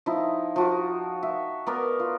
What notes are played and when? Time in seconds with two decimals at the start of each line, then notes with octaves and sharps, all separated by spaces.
0.06 F3 D#4 E4
0.56 F3 F#4
1.23 E5
1.67 B3 A#4 D5
2.00 F4